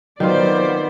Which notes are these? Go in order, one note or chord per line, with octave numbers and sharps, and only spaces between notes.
D#3 F#3 B3 C4 F4 C5 D5